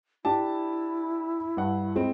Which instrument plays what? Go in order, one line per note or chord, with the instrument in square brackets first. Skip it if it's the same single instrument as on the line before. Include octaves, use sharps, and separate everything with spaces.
[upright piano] D4 G4 A5 [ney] E4
[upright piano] G2 F#5
G#3 C4